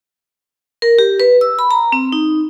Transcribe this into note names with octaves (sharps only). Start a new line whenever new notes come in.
A#4
G4
B4
E6
B5
A#5
C4
D#4